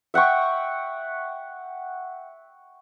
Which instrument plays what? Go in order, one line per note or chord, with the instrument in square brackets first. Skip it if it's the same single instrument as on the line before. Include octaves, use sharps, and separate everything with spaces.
[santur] E5 F#5 G5 C#6